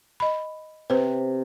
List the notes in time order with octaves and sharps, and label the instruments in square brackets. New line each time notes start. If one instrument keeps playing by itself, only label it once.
[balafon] D#5 B5
[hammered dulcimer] C3 [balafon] B4 C5